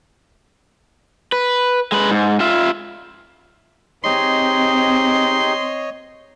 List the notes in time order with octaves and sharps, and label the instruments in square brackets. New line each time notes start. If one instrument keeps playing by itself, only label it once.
[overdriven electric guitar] B4
G#3 B4
G#2
F4 E5
[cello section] C4 [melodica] D#4 G4 G#4 [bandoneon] C#5 D#5 [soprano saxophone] C6